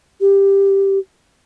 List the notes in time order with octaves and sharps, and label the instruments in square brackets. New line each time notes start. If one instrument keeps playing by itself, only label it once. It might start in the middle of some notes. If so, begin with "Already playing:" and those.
[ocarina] G4